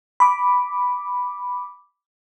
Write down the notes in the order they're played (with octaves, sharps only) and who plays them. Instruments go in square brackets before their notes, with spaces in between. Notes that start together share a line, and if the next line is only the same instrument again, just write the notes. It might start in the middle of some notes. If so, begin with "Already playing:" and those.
[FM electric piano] B5 D6